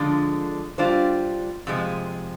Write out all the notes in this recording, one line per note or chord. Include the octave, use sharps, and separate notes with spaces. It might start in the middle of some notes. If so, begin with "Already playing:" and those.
Already playing: D3 F3 G#3 D4
G3 D4 F4 C5
F2 C3 F3 G#3